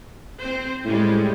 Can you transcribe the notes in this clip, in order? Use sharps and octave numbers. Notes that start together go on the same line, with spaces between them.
C4 C5
A2 G3 G#3 C#4